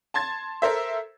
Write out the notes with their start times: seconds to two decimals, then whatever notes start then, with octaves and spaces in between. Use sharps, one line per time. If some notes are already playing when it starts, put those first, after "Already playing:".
0.14 A5 C6 G#6 A6
0.62 A4 A#4 C5 E5